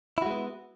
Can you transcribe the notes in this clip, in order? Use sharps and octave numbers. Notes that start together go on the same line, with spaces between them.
G#3 B3 E4 F#4